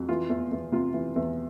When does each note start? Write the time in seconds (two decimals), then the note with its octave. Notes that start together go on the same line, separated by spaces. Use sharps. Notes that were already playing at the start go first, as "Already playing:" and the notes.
Already playing: F2 F#3
0.09 E3 F4
0.30 E2
0.52 E2
0.72 C3 F4
0.94 E3
1.16 E2